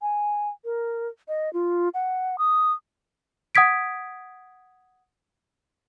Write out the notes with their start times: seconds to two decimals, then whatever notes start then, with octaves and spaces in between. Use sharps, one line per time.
0.02 G#5
0.65 A#4
1.28 D#5
1.53 F4
1.94 F#5
2.38 D#6
3.55 F#5 D#6 G#6 B6 D7